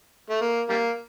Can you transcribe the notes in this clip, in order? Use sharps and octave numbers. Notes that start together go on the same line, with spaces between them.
A3
A#3
G3 A#3